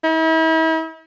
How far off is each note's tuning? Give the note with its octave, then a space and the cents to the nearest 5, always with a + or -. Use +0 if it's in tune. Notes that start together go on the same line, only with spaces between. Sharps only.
E4 -40